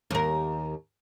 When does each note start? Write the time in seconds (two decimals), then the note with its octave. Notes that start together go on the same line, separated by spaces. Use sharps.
0.11 D#2 A#4